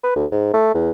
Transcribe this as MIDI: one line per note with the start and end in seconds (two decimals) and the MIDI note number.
0.04 0.15 71
0.16 0.25 38
0.32 0.54 44
0.54 0.72 57
0.75 0.91 40